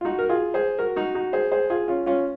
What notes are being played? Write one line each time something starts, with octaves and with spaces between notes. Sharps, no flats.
F4
D#4 F#4
A#4
F4 G#4
G#4 C5
F#4 A#4
D#4 F#4
D#4 F#4
G#4 C5
G#4 C5
F4 G#4
C#4 F4
C#4 F4